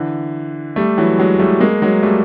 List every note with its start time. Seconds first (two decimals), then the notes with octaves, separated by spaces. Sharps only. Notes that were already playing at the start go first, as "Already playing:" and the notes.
Already playing: D3 E3
0.76 G3 A3
0.98 E3 F#3
1.18 F#3 G#3
1.39 G3 A3
1.60 G#3 A#3
1.82 F#3 G#3
2.03 G3 A3